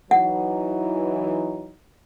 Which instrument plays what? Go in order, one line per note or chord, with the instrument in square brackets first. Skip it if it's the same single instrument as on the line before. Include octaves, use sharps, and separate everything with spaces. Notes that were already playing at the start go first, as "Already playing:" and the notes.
[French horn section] E3 F#3 D#4 [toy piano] F#5